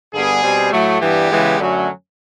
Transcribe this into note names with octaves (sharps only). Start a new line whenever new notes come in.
G2 D3 G3 B3 G#4
B2 G3 C4
A2 F#3 A3
G2 E3 G3 B3 G4
C#3 E3 G#3 B3
F#2 D3 F#3 A3 C#4